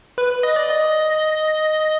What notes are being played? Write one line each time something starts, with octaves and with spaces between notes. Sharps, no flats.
B4
D#5
D5
D#5